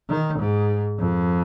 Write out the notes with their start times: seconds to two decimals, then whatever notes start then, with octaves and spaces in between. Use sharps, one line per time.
0.09 D#3
0.39 G#2
0.98 F2